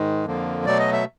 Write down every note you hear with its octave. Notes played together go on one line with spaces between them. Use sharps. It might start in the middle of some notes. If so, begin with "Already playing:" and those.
Already playing: G#2 D#3 G#3
F2 D3 F3 A#3
B2 F#3 A3 D5
D#5
E5